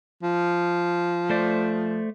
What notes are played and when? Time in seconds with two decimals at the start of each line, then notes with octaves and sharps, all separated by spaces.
0.23 F3
1.30 A3 C5 D5